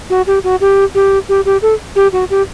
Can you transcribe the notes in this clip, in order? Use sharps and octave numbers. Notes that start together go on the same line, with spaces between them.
F#4
G4
F#4
G4
G4
G4
G4
A4
G4
F#4
G4